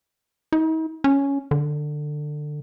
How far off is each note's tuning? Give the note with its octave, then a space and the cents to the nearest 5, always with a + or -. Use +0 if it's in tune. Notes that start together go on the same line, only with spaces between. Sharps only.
D#4 +45
C#4 +5
D3 +20